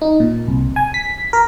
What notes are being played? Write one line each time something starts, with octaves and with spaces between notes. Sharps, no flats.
D#4
A#2
C2
G#5
B6
A#4